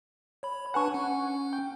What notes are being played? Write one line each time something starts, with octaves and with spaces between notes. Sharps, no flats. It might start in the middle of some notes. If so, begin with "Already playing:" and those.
C#5 B5
D4 B4 F#5 G#5 A5 C#6
C#4
G5